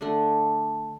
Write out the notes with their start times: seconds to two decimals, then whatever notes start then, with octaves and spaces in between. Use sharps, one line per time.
0.01 D3 A3 D4